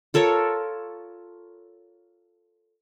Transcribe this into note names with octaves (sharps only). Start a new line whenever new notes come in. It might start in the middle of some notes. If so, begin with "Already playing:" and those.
F4 A4 A#4 C#5